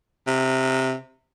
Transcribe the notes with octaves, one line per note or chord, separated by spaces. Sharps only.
C3